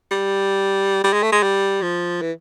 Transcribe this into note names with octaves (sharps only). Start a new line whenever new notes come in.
G3
G3
G#3
A3
G#3
G3
F3
E3